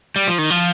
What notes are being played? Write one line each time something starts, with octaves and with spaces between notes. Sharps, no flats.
G3
F3
D#3
F3